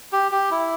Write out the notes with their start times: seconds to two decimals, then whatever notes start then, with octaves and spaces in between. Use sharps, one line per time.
0.12 G4
0.32 G4
0.51 E4